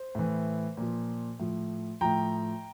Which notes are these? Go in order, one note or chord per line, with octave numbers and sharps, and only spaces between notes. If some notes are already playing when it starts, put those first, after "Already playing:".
Already playing: C5
A2 E3
A#2 F3
A2 F3
A2 F3 G5 A#5